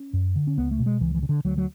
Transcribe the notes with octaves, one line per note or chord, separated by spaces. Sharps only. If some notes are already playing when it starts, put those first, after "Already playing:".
Already playing: C#4
F#2
D3
C#4
C#2 B3
A3
B2
G#3
C#2 E3
E3
C#3
D3
D2 F#3
F#3